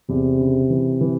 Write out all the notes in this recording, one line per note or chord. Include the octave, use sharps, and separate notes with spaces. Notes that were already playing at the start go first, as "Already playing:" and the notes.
E2 C3
C#3
E3
E3